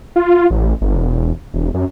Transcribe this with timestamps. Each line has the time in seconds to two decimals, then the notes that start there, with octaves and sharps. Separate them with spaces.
0.16 F4
0.50 A1
0.81 G1
0.97 E1
1.54 E1
1.74 F#2